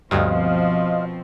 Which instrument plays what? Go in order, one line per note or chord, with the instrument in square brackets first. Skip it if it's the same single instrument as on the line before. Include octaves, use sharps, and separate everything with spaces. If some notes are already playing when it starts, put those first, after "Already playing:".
[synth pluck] D2 G2 [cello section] B2 F3 C4 [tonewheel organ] D#5 F5